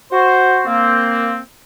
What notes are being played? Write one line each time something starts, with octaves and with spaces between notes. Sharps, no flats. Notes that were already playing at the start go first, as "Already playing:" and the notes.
F#4 C5
A#3 C4